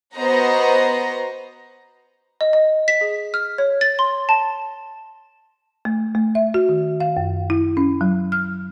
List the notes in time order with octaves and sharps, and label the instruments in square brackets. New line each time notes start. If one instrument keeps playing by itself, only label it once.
[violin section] B3 F#4 C5 D#5 F#5 A#5
[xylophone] D#5
D#5
B6
G#4
F6
C#5
A6
C6
A5
[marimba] A3
A3
E5
F#4
D#3
F5
F#2
E4
C#4
F#3
F6